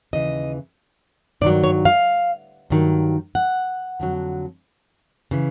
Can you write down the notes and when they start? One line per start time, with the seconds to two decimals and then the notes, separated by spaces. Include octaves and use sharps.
0.13 D#2 C#3 E3 D#5
1.41 G2 D#3 F#3 D5
1.64 C#5
1.85 F5
2.70 G2 D#3 F#3
3.35 F#5
4.00 F2 D3 F#3
5.31 C#3 E3